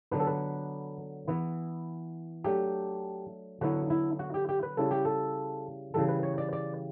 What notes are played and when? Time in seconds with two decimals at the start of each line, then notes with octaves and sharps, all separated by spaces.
0.11 D3 F#3 B3 D4 B4
0.19 A4
0.27 B4
1.27 E3 B3 E4
2.44 F#3 A3 D4 G4
3.61 D3 F#3 B3 E4 F#4
3.90 E4
4.19 F#4
4.34 G4
4.49 G4
4.63 B4
4.77 C#3 G3 C#4 E4 A4
4.91 G4
5.05 A4
5.94 C#3 E3 G3 A4
6.09 B4
6.23 C#5
6.38 D5
6.53 D5